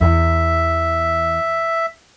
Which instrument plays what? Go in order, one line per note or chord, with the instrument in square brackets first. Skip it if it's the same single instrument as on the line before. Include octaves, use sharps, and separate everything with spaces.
[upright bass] E2 [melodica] E5